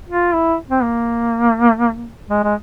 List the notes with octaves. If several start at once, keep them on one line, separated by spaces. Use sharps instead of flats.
F4
E4
C4
A#3
G#3
G#3